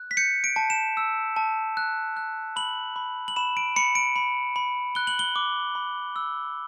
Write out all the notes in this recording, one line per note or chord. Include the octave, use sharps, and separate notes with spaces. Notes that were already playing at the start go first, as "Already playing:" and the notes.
Already playing: F#6
B6
G6 C#7
D7
A5
E7
E6
A5
F#6
F#6
B5 F#7
B5
F#7
B5 E7
D7
B5 C#7
D7
B5
B5
F#6 G7
F#7
G7
D6
B5
E6